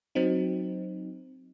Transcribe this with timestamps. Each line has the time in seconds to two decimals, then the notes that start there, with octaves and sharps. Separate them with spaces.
0.15 F#3 C4 D#4